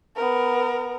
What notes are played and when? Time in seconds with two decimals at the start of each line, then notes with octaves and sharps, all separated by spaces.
0.16 B3 A#4